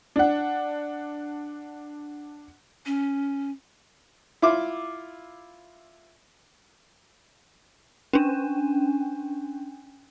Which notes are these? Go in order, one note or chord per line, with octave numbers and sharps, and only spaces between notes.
D4 F#5
C#4
E4 F4 C6 D6
C#4 D4